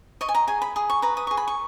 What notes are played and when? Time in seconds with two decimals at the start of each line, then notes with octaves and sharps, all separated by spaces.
0.21 D#5 C#6
0.29 G#5
0.35 A#5
0.47 G#4 G#5
0.62 B5
0.76 G#4 D#6
0.90 C#6
1.02 B4 A#5
1.17 D#6
1.27 G#4 C#6
1.37 B5
1.48 C#6